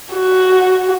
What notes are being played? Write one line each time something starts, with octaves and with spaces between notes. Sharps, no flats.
F#4